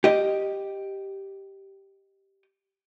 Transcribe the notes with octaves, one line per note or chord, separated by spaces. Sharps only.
G4 D#5